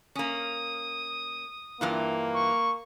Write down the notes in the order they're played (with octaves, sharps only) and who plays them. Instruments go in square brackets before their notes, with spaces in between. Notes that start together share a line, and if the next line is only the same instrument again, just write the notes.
[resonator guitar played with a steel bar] A#3 C#4 [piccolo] D#6
[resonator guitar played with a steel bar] G2 E3 F4 [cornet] A#3
[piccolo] C#6